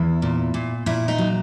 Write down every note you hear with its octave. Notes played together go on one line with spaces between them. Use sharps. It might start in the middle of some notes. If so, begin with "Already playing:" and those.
Already playing: E2 E4
A#2
A#2
A#2 E4
D#4
F#3